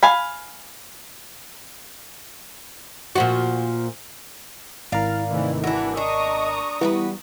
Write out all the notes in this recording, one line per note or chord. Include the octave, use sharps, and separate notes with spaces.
F5 G#5 B5
A#2 F3 F#4
G#1 E4 A#4 D5 F5
C3 D#3 E3 A3
E3 D4 F#4
D4 D#5 A#5 C#6 D#6
E3 G3 B3 F#4 A#4 B4